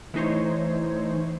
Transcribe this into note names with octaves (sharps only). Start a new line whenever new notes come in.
E3 A3 D#4 C5 C#5